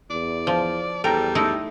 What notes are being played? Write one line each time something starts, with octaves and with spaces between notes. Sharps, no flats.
E2 D5
F3
E2 G3 A4 A#4 G5 A#5
A3 D#4 E4